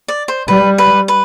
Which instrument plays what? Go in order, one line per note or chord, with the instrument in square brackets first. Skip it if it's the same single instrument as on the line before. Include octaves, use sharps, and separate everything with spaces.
[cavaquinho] D5
C5
[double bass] G3 [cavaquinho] B4
[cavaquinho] B4
B4